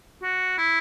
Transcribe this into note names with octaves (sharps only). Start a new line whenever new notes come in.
F#4
E4